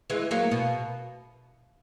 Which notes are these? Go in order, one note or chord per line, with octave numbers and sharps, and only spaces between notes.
E3 G#3
F#3 A#3
B2